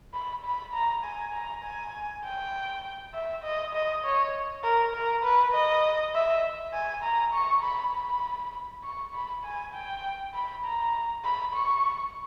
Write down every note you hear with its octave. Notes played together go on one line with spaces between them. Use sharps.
B5
B5
A#5
G#5
A#5
G#5
G5
E5
D#5
D#5
C#5
A#4
A#4
B4
D#5
E5
G#5
A#5
C#6
B5
B5
C#6
B5
G#5
G5
B5
A#5
B5
C#6